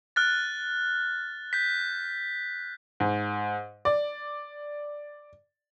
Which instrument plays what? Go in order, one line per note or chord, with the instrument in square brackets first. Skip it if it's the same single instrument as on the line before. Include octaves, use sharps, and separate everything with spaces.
[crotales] F6 F#6 A6
G6 B6
[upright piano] G#2
D5